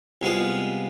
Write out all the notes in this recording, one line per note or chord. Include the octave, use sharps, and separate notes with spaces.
C2 G#3 B3 F4